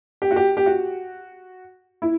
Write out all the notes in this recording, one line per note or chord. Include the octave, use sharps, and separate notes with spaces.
G4
F#4
G4
G4
F#4
E4